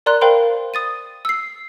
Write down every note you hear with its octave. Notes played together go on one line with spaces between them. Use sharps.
A#4 D5 A#5 C6 F#6
A#4 C5 F5 G5 B5 C6
D#6 A6 D#7
E6 C7